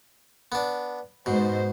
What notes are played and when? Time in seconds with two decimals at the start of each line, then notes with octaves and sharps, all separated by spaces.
0.52 B3 D4
1.26 G#2 B2 C5